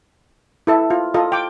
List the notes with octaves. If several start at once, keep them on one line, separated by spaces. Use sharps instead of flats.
E4 A4 E5
F4
F4 A4 D#5
G5 D6